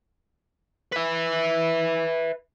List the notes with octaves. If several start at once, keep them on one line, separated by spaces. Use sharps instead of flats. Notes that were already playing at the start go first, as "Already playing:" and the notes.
B4 E5